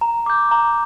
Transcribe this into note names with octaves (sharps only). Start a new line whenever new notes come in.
A#5
D6 G6
A#5